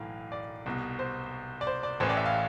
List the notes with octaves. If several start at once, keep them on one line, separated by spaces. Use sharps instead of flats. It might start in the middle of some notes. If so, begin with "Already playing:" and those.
Already playing: B1 A2 E3 F5
D5
C2 B2
C5
D5
C5
D5
A1 A2 E3 C5
D5
E5
F5